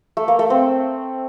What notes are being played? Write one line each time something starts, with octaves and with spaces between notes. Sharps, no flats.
A3
A#3
A3
C4